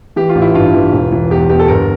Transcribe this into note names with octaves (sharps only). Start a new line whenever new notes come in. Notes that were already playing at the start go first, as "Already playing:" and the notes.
E3 G4
F4
A1
E4
G2 F4
E3
E1
E3
E2 G4
E2 G4
A4
G1 A#4